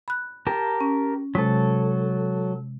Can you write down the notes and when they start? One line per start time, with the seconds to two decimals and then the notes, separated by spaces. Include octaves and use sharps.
0.08 B5 F#6
0.47 G4 A#4 A5
0.81 C#4
1.35 C3 F#3 G#3 A4